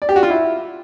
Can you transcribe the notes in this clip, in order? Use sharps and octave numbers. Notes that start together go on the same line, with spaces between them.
D5
G4
F#4
F4
E4